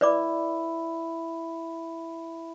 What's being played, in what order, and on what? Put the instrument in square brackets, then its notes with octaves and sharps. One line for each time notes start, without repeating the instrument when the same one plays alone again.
[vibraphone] E4 E5 B5 [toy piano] B4 D5 D6